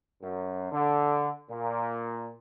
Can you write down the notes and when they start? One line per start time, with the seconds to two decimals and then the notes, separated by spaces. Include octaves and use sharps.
0.22 F#2
0.71 D3
1.50 A#2